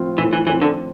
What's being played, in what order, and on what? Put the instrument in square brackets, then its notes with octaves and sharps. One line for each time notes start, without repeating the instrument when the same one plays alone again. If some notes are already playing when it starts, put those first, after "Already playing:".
Already playing: [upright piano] A2 F3 C4 F4
[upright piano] A2 [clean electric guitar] E3
[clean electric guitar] E3
[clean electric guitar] E3 [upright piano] F3 C4 F4
[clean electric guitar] D3